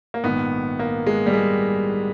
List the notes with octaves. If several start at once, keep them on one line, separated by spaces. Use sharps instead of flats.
A#3
A#1 G#2 D#3 B3
A#3
G#3
G3
G#3